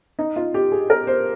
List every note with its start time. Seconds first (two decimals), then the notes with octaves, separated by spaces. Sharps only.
0.19 D#4
0.36 F4
0.54 G4
0.72 G#4
0.90 A#4
1.07 C5